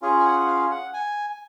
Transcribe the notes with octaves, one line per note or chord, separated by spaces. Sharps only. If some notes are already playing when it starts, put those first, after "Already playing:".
C#4 F4 G#4
G#5
F#5
F#5
F5
F#5
G#5